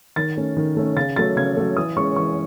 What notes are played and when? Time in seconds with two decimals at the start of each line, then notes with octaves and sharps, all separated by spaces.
0.16 D#3 A6
0.37 A3 C#4
0.57 D#3
0.77 A3 C#4
0.96 C#3 A6
1.16 F#3 A3 A6
1.36 C#3 G#6
1.57 F#3 A3
1.77 E3 D#6
1.97 G#3 C#4 C#6
2.16 E3 C#6